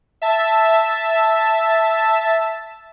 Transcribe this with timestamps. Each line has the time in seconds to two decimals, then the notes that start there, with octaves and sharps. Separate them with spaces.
0.22 E5 A5